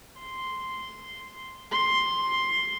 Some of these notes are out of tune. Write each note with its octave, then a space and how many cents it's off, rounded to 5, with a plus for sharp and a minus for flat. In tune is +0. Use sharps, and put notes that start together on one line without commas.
C6 -5
C6 +5